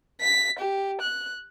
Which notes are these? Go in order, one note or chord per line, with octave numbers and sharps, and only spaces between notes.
B6
G4
F#6